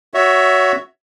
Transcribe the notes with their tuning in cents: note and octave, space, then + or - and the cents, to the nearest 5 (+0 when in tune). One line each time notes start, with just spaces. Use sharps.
F#4 +0 C#5 +20 E5 +0